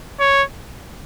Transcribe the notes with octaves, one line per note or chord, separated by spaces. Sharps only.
C#5